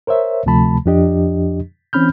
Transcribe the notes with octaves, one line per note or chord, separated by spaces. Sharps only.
A#4 C5 C#5 E5
D2 C3 F3 A3 A5 B5
F2 F3 D4 G4 D#5
E3 C4 C#4 B5 F6 G6